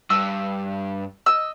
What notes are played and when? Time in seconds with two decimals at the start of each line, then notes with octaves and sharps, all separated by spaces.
0.10 G2 E6
1.26 D#5 E6